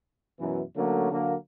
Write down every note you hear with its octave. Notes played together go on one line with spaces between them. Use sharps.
F#2 B2 E3
D3 F#3 A3 A#3 C#4
D3 F#3 A#3